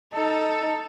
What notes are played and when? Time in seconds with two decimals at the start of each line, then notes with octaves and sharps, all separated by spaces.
0.14 D#4 A4